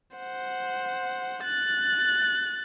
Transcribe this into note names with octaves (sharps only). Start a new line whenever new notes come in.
C5 F#5
F#6 A6